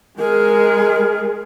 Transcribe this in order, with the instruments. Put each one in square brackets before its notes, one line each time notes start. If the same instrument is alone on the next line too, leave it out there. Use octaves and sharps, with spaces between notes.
[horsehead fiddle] G#3 G#4 [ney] A#4